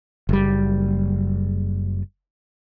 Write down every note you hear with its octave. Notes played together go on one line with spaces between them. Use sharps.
F#1 G3